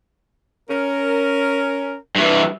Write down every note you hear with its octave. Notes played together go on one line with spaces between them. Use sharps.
C#4 A#4
G2 E3